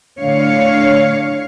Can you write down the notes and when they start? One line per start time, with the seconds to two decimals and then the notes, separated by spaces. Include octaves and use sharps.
0.21 A2 D3 C#5 F5